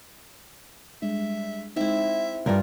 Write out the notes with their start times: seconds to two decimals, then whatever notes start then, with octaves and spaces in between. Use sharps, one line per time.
1.02 G3 G#3 D4 E5
1.76 G#3 C4 D#4 E4 E5
2.46 C#2 G2 G3 F4 A#4 D5